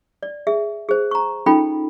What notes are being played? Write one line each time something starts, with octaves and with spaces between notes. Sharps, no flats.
D5
G#4 E5
G#4 C5
A#5 C#6
C#4 D#4 F4 A4 G5 B5